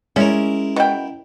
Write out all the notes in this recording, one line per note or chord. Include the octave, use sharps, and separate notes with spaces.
G#3 C#4 E4 A#4
B2 G5